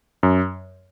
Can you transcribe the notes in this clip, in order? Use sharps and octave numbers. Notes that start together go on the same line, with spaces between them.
F#2